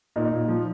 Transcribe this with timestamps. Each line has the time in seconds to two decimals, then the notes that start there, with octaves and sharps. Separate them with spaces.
0.16 A#2 D#4
0.32 A#2
0.48 F3